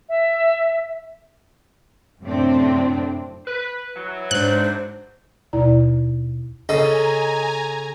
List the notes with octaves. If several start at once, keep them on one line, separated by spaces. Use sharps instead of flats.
E5
F#2 A2 C3 C4 D4
B4
E3 F#3
G#2 D4 C5 F#6
D#2 B2 E4 D5 A#5
C#3 A4 D#5 G#5 A#5